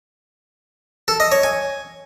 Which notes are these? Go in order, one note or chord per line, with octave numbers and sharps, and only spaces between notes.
A4
D#5
C#5
G#5